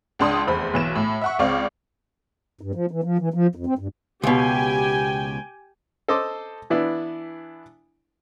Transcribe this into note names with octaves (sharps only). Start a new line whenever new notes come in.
C#2 D4 C6 D#6
F1 E2 C5 B5
B1 E3 E7
A2
E5 F#5 C#6
C#2 C4 D5 F5 C#6
G2
F3
E3
F3
E3
F3
F2
C4
G2
C#2 B2 G4 G5 G#5
A4 C5 D#5 A5 C6 D6
E3 B3 D4 E4